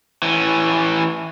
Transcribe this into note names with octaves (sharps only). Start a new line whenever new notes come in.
E3 C#4